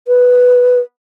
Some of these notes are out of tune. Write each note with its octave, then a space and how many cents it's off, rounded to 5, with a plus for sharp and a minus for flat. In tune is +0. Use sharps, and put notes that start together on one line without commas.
B4 +0